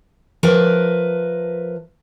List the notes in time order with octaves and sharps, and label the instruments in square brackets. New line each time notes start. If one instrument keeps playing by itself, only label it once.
[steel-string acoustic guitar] F3 A#4 B4 E5